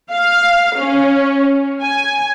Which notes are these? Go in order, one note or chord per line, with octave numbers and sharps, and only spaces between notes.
F5
C#4
G#5